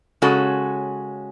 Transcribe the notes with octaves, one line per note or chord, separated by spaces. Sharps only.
C#3 G#3 C#4 F#4 A4